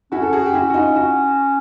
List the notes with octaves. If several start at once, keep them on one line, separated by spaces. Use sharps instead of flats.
C#4 E4 F#4
A4
F#4 G#4
G4
E4 F#4
F#4
D#4 F4
E4 F#4